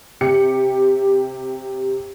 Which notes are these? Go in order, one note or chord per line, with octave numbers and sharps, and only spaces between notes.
C3 G4 C#7